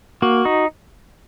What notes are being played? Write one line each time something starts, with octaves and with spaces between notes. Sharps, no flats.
A#3 F#4
D#4